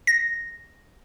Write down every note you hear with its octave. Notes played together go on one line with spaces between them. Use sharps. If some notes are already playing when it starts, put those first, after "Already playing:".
A#6